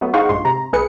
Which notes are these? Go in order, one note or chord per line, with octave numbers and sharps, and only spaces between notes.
F#3 A3 B3
D#4 G#4 C5 F5 F#5 C#6
A#1 G2 G#3 C6
C3 A#5
B1 A3 G#4 B4 C#7